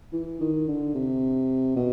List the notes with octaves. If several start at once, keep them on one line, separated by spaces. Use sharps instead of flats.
E3
D#3
D3
C3
B2